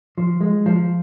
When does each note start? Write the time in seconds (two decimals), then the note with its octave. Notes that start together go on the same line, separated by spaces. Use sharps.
0.18 F3
0.41 G#3
0.66 F3